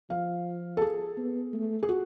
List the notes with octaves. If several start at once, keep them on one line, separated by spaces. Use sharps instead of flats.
F3 F5
A4
G#4
B3
A3
G#4
F#4